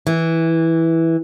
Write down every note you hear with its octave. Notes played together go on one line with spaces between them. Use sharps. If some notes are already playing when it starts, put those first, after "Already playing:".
E3